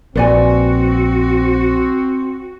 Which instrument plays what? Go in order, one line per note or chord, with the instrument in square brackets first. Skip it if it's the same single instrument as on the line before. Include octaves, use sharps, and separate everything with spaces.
[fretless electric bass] A#1 [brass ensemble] C4 [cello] F#4 [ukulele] B4 D5 G#5